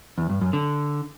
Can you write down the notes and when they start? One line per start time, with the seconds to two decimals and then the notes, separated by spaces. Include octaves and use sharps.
0.18 E2
0.30 G2
0.41 F#2
0.53 D3